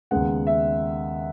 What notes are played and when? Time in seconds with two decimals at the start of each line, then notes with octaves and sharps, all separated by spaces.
0.11 D#2 C#3 G#3 B3 F#5
0.47 E5